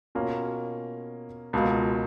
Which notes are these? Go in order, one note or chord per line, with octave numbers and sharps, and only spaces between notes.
B2 A#3 C#4 F4
C#2 B2 A#3 F4